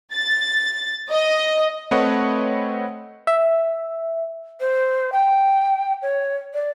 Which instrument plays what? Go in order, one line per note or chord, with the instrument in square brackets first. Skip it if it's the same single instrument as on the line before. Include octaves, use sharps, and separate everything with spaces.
[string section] A6
D#5
[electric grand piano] A3 C4 B4 C#5 D#5 F#5
[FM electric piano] E5
[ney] C5
G5
C#5
D5